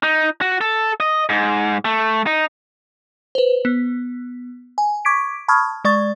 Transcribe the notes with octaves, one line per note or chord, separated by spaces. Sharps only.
D#4
F#4
A4
D#5
G#2
A3
D#4
B4 C5
B3
G#5
C#6 D6 G#6 B6 D7
A5 B5 C#6 D#6 F6 G#6
G#3 D5 C#6 A6